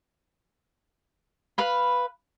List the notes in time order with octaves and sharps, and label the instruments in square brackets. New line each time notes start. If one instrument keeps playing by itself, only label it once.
[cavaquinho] B4 F5 B5